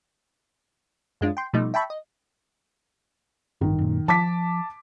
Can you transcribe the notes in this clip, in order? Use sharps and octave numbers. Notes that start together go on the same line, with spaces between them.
F#2 G#3 D4 F4
G5 C6
B2 F3 G3 A3 D#4
E5 G5 A5 B5 C#6
D#5
A1 G2 D#3
F#2 A#2
F3 A5 D6 B6